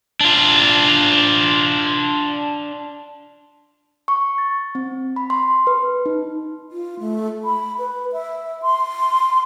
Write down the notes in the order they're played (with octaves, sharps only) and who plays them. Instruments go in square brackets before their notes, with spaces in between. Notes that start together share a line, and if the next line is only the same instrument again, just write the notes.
[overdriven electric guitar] D4 F4
[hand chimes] C#6
A6
C4
B5
C6
B4
D#4
[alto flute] F4
A3
B5
B4
E5
C6